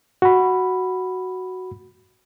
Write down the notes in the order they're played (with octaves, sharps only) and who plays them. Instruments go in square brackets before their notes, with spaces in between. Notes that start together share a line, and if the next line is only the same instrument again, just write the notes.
[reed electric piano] F#4 B5